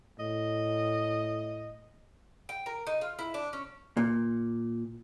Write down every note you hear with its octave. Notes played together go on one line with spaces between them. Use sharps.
A2 D#5
G5
A#4
D#4
F4
E4
D4
C#4
A#2